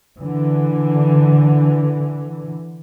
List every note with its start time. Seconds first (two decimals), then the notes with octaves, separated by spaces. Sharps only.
0.21 D3 E3